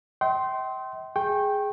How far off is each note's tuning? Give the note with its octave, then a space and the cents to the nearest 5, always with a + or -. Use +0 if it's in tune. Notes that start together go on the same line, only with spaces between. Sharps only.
E5 -45 G5 -35 C6 +0
G#4 +0 G5 +0 C#6 -30